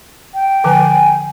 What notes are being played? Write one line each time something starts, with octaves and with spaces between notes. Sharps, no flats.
G5
D3 F3 B4 G#5